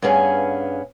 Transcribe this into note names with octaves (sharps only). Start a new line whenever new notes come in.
G2 B3 C#4 G#4 F5 G#5